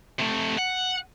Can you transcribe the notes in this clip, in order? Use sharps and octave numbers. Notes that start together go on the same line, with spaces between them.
C3 A3
F#5